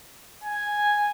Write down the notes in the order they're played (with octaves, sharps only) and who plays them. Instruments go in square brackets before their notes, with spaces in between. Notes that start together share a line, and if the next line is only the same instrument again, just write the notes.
[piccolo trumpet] G#5